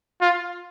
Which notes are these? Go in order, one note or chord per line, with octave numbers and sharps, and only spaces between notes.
F4